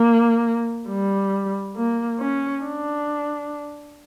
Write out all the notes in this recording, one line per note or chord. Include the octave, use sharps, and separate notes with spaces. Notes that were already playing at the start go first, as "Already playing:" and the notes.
Already playing: A#3
G3
A#3
C#4
D4